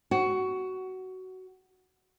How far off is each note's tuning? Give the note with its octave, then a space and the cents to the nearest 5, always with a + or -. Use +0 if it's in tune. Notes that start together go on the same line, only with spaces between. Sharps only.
F#4 +15